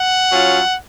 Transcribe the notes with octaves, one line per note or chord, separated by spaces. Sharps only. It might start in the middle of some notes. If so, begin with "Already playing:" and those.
Already playing: F#5
F#3 C#4 F4